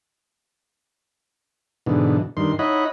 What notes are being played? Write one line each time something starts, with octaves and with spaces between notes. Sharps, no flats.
G#2 B2 D3 E3
G2 D#3 C6
D#4 E4 C#5 D#5 F#5 B5